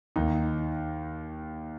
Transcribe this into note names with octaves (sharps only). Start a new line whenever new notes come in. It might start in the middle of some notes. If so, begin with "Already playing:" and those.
D#2 D#3 D#4